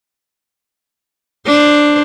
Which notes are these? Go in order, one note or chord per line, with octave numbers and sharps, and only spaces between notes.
D4 C5